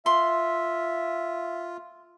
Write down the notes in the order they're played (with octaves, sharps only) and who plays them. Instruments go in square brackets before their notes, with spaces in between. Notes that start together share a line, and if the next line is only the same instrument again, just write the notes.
[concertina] F4 [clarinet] E5 [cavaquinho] C6